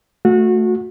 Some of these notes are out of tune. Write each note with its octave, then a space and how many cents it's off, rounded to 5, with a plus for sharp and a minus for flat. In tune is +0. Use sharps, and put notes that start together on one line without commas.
A3 +0 F#4 -25